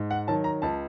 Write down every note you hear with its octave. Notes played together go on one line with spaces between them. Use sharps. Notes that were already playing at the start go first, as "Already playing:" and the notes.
Already playing: G#2
F#5
D#3 F#3 A5
A#5
C#2 A5